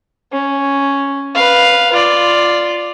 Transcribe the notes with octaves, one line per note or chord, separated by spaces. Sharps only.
C#4
B4 F5
F4 D5